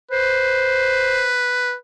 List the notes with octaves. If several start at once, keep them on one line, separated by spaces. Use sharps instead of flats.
B4 C5